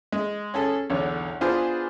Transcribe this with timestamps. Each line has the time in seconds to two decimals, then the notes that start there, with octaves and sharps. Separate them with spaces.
0.12 G#3
0.54 C#4 G#4 A4
0.90 B1 E2 D3 C#5
1.41 B3 D4 F4 G#4 B4 C5